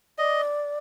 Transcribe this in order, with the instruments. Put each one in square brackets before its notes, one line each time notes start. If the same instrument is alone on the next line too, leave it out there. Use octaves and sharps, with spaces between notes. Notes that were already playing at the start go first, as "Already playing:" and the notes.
[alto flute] D5 [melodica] D#5